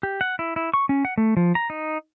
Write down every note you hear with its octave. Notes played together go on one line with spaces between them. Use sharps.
G4
F#5
E4
E4
C#6
C#4
F#5
A3
F3
A#5
D#4